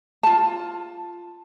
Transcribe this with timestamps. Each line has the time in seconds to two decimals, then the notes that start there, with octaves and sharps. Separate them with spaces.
0.23 F4 A5